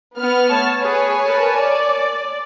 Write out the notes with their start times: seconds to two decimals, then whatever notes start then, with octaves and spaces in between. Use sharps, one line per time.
0.18 B3 F6
0.49 A3 C#5 A5
0.82 G#4 B4 C#5 G#5
1.26 A#4 B4 A5
1.59 D5